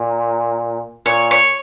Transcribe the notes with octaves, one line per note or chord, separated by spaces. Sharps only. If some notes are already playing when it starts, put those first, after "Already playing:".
Already playing: A#2
A#2 C#5
C#5